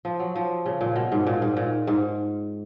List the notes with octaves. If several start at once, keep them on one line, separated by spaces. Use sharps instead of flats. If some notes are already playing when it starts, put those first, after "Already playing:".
F3
F#3
F3
C#3
A#2
B2
G#2
A#2
G#2
A#2
G#2